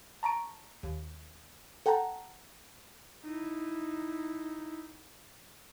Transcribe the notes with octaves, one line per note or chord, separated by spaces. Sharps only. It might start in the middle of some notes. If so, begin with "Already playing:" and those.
A5 A#5 C#6 D7
D#2
A4 F#5 G5 A5 A#5
D#4 E4